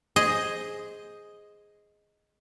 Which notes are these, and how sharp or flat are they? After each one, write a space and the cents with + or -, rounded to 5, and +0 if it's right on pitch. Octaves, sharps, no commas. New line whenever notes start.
G#4 +0 C5 +0 D#5 +0